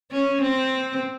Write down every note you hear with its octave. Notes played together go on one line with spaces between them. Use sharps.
C#4
C4